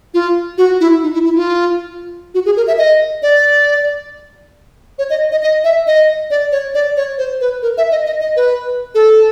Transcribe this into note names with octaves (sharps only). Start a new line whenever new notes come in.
F4
F#4
E4
D#4
E4
E4
F4
F#4
G#4
A#4
E5
D#5
D5
C#5
D#5
D#5
D#5
E5
D#5
D5
C#5
D5
C#5
C5
B4
A#4
E5
D#5
D#5
D#5
B4
A4